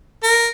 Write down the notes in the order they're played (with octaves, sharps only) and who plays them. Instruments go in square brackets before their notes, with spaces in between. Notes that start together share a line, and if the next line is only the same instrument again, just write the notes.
[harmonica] A#4